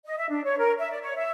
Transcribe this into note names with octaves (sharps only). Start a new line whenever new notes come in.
D#5
E5
D4
C#5
A#4
E5
D5
C#5
E5